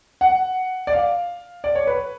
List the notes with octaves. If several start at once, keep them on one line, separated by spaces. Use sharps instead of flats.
F#5
D5
F5
D5
C#5
B4